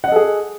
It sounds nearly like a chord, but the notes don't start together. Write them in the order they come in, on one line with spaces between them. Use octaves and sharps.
F#5 D#5 A4 G#4